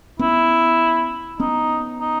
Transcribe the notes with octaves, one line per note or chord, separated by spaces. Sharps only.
B3 C#4 E4
B3 C#4 D#4
D#4